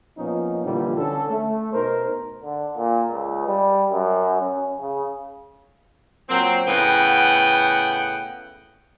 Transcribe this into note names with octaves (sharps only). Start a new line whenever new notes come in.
A#2 F3 B3 C#4 D#4
A#2 D3 E3 F3 G3
D3 C#4 A4
A3
B2 D#4 A#4 C5
D3
A#2
C#2
G3
F#2
C#4
C#3
A#2 F#3 C4
A2 C#3 B3 F#5 G5